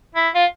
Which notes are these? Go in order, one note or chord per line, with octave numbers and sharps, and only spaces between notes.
E4
F4